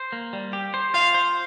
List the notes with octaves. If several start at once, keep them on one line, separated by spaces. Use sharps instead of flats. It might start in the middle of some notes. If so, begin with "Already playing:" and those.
Already playing: C5
A#3
G3
G4
C5
F4 F5
C5